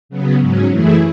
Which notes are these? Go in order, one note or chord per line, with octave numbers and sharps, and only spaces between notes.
C#3 F#3 B3
G#2 F#3 C#4
F#2 E3 A3 E4 G#4